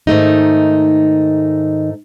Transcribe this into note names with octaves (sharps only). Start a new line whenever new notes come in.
G#2 D#3 A3 D#4